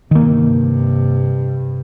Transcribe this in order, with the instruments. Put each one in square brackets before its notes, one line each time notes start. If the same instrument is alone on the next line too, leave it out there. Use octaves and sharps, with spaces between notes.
[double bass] G2 C3 [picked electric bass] D#3 A#3